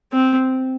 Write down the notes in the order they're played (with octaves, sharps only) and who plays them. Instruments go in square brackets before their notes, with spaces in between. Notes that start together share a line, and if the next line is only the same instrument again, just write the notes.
[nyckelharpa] C4